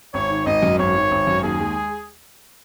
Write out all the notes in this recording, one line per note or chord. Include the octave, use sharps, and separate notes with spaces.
G#1 C#5
D#3
G#1 D#5
F#2
G#1 C#5
D#3
G#1
F#2
D#2 G#4
G#3